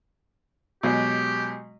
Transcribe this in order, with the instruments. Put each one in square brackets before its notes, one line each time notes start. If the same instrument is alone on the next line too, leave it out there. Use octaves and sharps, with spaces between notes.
[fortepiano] B2 F#3 G#3 [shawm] G4